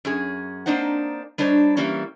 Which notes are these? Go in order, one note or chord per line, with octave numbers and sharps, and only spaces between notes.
F#2 C#4 G#4
A#3 C4 D4 D#4 C5 F#5
G3 D4 D#4 C5 C#5
E3 G3 A#3 C#4 E4